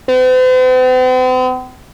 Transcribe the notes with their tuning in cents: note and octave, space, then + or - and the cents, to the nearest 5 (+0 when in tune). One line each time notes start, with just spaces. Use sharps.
C4 -45